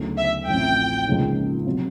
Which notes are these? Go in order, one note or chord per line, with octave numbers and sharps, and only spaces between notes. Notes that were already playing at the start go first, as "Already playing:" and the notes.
Already playing: D2 C#3 F#3 B3 D#4
E5
A1 A2 F3 A3 C4 G5
C#2 C#3 F3 A#3 D#4
C3 D#3 F#3 B3